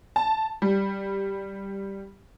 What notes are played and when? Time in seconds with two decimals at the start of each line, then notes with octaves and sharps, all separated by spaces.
0.16 A5
0.62 G3